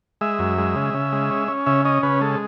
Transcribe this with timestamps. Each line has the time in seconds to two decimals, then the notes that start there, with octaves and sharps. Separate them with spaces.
0.21 G#3 E5
0.39 F#2
0.58 G#3
0.76 C#3
0.94 C#3
1.12 G#3
1.31 C#4
1.48 C#4
1.66 C#3 E5
1.85 C#4 D#5
2.03 C#3 B4
2.21 G#3 A4